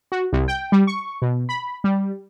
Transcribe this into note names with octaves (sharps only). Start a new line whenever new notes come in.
F#4
C2
G5
G3
C#6
B2
B5
G3